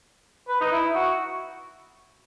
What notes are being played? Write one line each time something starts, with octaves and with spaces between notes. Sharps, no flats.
B4
D#4
E4
F#4